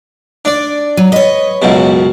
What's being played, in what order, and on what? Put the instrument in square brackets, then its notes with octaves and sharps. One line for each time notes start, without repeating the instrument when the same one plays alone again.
[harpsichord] D4 D5
[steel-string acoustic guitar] F#3
[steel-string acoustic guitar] B4 C#5 [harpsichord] D#5
[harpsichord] C#2 F#2 B2